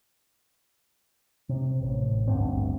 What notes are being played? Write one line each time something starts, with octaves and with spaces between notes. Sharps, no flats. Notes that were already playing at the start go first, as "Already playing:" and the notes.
C3
A1
G1 D2 G2 C4